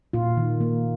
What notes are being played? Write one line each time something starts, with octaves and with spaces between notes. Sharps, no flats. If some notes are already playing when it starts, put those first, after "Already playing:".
A#2 F4
D#3
A#3